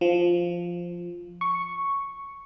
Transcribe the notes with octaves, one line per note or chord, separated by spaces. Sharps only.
F3
C#6